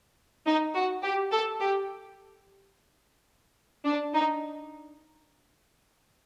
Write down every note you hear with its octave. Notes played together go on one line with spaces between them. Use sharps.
D#4
F#4
G4
A4
G4
D4
D#4